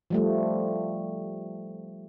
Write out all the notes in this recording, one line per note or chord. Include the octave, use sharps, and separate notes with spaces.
F3 G3 A3